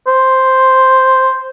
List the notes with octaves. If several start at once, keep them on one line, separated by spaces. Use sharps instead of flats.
C5